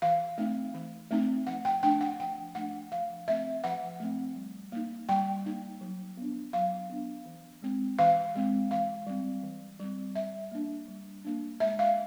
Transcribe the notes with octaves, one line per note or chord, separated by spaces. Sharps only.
E3 F5
A3 C4 D#4
E3
A3 C4 D#4
F3 F#5
G5
A3 D4 G5
F#5
F3 G5
A3 D4 F#5
F3 F5
A3 C4 E5
F3 F#5
A3 C4
G3
A#3 D#4
G3 G5
A#3 D#4
F#3
B3 D4
F#3 F5
B3 D4
E3
G#3 C4
E3 F5
G#3 C4
E3 F5
G3 C4
E3
G3 C4
G3 E5
A#3 D4
G3
A#3 D4
G#3 E5
F5